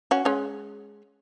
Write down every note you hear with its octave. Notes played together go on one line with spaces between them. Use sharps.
C#4 F#4
G#3 C#4